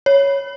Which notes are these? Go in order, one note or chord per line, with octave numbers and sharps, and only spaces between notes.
C#5